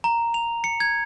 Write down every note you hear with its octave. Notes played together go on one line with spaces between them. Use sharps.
A#5
F7
C#7
G#6